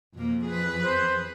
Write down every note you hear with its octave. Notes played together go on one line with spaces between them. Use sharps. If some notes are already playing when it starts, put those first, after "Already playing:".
F2 B2 A#3
G#4 B4
C5